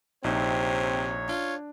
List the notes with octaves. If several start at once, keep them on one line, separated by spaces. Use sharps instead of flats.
A#1 C3 C4 D#4 C5 C#5
D4 F4